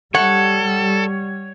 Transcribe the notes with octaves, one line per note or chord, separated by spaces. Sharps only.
G3 A4 C#5 F#5